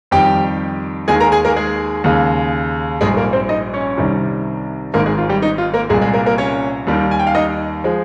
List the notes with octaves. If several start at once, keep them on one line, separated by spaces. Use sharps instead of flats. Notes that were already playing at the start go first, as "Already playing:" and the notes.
F2 D#3 G3 G4 G5
D#2 D#3 G#3 G#4 G#5
A#4 A#5
G#4 G#5
A#3 A#4
G#3 G#4
D#2 C#3 G#3
A#1 G#2 G3 G#3 G#4
A#3 A#4
C4 C5
D#4 D#5
C#4 C#5
C2 C3 D#3 G3
G#1 G#2 D#3 A#3 A#4
G#3 G#4
F4
G3 G4
D#4
F4
A#3 A#4
C2 A#2 G3 G#3 G#4
G#3 G#4
A#3 A#4
A#3 A#4
C#4 C#5
D#2 D#3 G3
G#5
G5
F5
D#4 D#5
F3 G#3